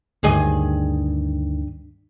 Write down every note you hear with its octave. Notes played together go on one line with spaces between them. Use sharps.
D2 G2 D#3 G#4 D#5